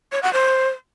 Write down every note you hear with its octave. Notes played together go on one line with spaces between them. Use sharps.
C#5
F#5
C5